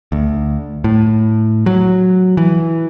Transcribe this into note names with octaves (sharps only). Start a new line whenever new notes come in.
D2
A2
F#3
E3